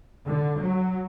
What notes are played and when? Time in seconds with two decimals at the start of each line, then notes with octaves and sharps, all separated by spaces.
0.24 D3
0.60 F#3